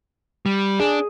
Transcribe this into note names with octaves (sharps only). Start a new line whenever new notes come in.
G3
D4 G#4